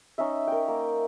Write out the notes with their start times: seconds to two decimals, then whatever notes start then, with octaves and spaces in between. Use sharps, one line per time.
0.18 C#4 D#4 D#5 E5
0.48 A#4 G5
0.68 A#3